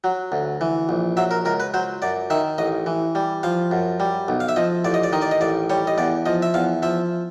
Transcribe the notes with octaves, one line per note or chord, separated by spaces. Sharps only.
F#3
D2
E3
A#1
F#3 E5
A#4
C#2 A#4
B4
F#3 C5
F#2 D5
D#3 E5
A1 D#5
E3
G3
F3 F5
F#2
G3
B1
F5
E5
F3 D#5
A1 D5
D#5
D5
D#3 D#5
D5
D#5
A1 D5
G3 C#5
D#5
E2 D5
F3 D#5
E5
E2 F5
F3 E5